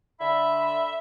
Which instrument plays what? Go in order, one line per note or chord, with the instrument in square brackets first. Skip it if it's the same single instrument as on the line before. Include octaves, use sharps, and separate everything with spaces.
[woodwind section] D3 B5 [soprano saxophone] E5